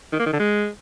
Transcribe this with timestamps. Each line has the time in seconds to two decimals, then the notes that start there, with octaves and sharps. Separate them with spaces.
0.13 D#3
0.19 A#3
0.26 D#3
0.33 D3
0.39 G#3